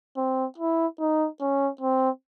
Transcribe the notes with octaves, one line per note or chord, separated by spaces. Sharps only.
C4
E4
D#4
C#4
C4